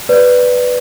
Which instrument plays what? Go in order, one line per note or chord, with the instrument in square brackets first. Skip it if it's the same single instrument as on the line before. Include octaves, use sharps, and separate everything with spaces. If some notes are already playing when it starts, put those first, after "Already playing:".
[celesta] B4 D5